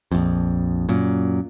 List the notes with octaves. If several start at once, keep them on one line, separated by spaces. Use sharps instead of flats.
A#1 F2
F#2 A#2